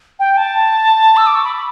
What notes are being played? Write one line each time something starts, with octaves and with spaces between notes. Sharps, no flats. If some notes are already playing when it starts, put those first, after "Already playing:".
G5
A5
E6
D6
C#6
B5
B5